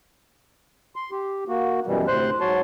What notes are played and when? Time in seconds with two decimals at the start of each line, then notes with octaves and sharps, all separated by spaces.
0.96 C6
1.11 G4
1.48 A#3 F#4
1.87 F#2 B2 E3 G3
2.08 D2 A2 C3 C5 C6 F#6
2.40 G#2 F#3 F#4 C#5 A5 C6